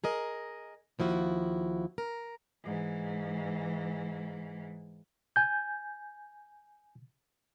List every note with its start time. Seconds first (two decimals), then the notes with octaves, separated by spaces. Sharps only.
0.04 G#4 A#4 D#5
0.99 D#2 F3 E4 F#4
1.98 A#4
2.64 G#2 E3
5.36 G#5 G6